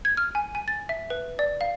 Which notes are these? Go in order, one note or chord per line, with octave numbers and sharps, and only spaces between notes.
G#6
F6
G#5
G#5
A6
E5
B4
D5
F5